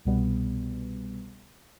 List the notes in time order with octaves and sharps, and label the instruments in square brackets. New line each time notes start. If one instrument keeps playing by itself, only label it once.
[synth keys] C2 B2 G3 B3